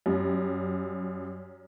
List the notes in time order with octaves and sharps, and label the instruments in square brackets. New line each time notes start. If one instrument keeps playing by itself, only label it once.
[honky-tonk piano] F#2 G3